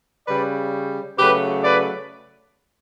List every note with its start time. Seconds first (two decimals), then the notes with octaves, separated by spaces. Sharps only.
0.28 C#3 G3 B4 D5
1.18 C#3 F#3 A3 G4 B4
1.64 B4 D5